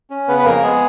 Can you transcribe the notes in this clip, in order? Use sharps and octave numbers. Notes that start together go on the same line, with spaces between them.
C#4
C#3 B3 B4
B4
F2 A#3 A#4
G#3 B3 G#4